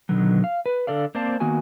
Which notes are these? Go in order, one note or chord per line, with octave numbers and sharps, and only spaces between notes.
B2 D3 D#3 F#3
F5
B4
D3 A4 D5 F5
A#3 C4 C5 D5 F5 A5
D#3 A#3 B3 F#4 G#5